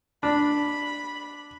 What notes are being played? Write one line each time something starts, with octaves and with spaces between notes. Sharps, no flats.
D4 B5